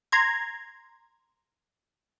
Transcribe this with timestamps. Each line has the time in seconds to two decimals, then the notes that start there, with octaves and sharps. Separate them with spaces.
0.12 A#5 C6 G#6